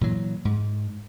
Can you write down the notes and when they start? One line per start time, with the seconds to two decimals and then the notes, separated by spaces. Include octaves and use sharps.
0.01 A#2 E3 F#3
0.45 G#2